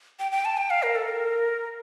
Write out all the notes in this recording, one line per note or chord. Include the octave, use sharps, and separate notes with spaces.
G5
G5
A5
G5
F5
A#4
A4
A#4